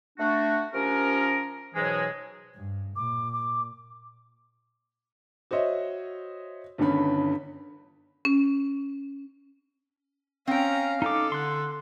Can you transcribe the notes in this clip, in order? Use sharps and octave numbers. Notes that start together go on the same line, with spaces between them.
A3 D4 F#4
F3 C#4 G4 A#4
G#2 B2 E3 F#3 G#3
G2
A#2 D6
D6
F#4 C5 C#5 D#5 E5
G1 G2 D3 D#3 C#4 B5
C#4
C4 C#4 F5 G5 A#5
D#4 A4 D6
D3 C6 F#6